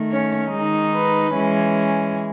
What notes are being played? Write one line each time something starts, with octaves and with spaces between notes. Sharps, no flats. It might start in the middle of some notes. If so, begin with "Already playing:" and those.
Already playing: D#3 A3
C#4 C#5
D#3 G#3 D#4
B4
E3 G#3 C#4